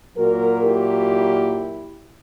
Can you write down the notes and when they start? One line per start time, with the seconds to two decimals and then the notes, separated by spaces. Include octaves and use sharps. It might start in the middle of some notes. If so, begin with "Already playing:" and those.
0.16 A#2 F#3 F#4 A#4
0.64 E4 G4